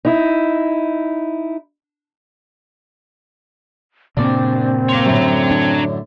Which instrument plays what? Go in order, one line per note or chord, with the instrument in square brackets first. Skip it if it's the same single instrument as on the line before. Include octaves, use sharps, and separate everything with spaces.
[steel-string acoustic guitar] D#4 E4
[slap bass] G2 A#2 C#3 [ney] C4 [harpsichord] D4
[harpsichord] A#3 C6 [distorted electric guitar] C#5 A#5
[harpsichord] F#2 A2 D3
[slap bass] D4